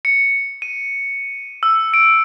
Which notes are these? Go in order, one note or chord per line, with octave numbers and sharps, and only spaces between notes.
C#7
D#7
E6
D7